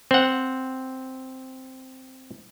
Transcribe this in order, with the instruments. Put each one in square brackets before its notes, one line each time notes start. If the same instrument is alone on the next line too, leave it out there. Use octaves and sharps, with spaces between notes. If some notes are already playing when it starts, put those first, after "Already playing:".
[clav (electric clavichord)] C4 F#5